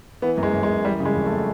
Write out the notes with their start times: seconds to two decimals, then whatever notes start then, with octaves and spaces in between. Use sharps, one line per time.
0.22 E3 B3
0.37 F#2
0.43 G#3
0.53 F#2
0.63 G#3
0.69 F#2
0.84 E3 G3
1.00 C#3
1.05 G#3
1.16 F2
1.26 A3